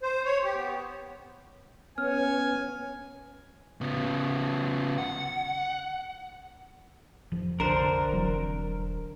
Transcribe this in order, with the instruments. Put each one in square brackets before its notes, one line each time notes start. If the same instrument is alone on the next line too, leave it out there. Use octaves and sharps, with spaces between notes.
[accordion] C5
C#5
G4
B3
[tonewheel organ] B3 C#4 [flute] C#5 [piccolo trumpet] G#5 [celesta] F6
[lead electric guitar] C#3 B3
F#5
[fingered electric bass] F1 F3
[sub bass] A#1 [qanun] D3 C5 [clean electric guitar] A#4
[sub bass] E1 [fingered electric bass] E3 F#3 C4